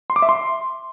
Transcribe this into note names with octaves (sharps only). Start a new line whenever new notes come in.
C6
D6
E5
C6